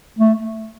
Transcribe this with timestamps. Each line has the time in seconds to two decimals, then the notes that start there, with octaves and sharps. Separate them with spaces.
0.19 A3